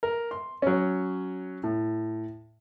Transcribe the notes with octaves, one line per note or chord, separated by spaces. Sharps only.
A#4
C6
F#3 C#4
A2